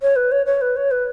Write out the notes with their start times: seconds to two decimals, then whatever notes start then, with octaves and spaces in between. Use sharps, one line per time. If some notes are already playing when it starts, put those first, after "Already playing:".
0.02 C#5
0.16 B4
0.32 C#5
0.46 C#5
0.61 B4
0.77 C#5
0.91 B4